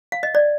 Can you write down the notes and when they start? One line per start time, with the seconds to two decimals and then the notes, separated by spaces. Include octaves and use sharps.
0.12 F5
0.23 D#5
0.35 D5